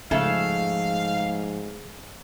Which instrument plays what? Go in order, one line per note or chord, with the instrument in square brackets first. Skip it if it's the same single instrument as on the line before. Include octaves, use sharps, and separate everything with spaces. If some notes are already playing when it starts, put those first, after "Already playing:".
[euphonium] G#2 [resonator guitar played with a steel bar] C#3 A3 A4 [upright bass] F3 [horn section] F5